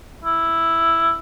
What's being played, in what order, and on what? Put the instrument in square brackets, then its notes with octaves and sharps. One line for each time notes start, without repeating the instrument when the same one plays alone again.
[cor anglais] E4